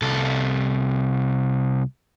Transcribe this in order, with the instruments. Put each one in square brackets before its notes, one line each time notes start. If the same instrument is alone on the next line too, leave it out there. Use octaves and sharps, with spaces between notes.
[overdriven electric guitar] C2 A4